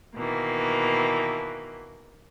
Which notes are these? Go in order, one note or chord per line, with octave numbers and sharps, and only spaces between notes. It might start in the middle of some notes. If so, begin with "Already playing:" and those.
B2 D#3 E3 A#3